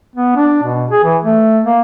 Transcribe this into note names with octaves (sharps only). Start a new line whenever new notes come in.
B3
D4
B2
G#4
E3
A3
A#3